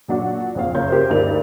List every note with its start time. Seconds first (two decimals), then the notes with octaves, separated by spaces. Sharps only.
0.08 A#2 F#3 D4 F#4
0.55 A#1 F2 F5
0.74 F#1 C#5 G6
0.88 G4 A#4 C5
1.10 D2 G2 D#4 A#4 D5 F7